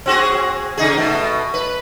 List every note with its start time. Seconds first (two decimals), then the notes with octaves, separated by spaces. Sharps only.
0.06 C4 F#4 G#4
0.78 C#3 D#4 G#4
0.97 B2 A3
1.54 B4